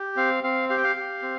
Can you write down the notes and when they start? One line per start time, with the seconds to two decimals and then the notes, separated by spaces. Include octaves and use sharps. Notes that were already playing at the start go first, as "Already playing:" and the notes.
Already playing: G4
0.16 C4 F5
0.43 C4 F5
0.69 G4 F5
0.78 G5
0.84 F5
0.96 G4
1.22 C4